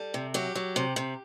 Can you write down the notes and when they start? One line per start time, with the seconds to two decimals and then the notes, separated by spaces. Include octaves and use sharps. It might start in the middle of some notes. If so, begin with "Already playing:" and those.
Already playing: G3 A4
0.14 C3
0.34 F#3 G4
0.55 F#3
0.76 C3
0.96 C3